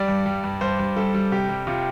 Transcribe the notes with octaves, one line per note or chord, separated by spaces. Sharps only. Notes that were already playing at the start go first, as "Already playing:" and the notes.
Already playing: G3 D5
G2
G3
G2
G2 C5
G2
G3 A4
G3
C3 G4
G3
C3 F4